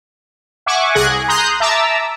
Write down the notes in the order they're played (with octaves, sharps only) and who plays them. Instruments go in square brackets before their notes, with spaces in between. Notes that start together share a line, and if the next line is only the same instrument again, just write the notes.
[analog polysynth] E5 F#5 G#5 C#6 D6
C2 G#4 F#6 G#6 A#6
G#4
A#5 C6 D#6 F#6 G6
E5 A5 A#5 D6 E6